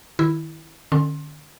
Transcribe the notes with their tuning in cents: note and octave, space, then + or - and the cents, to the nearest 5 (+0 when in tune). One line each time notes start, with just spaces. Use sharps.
D#3 +0 E4 +0
D3 +35 C#4 -5 C6 +25